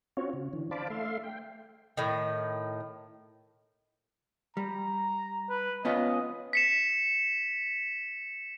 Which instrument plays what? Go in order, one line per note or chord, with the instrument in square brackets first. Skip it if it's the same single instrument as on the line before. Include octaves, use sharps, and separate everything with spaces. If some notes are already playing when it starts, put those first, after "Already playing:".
[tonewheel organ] C4 C#4 F4 F#4 C#5
C#3
D3 E3
C5 D5 F5 A5 B5 D6
A3 E5 F5 C6
G5
[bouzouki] A2 D#3
[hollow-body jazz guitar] G3 [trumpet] A#5
[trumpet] B4
[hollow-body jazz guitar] B3 C#4 F4 [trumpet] D#5
[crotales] B6 C#7 E7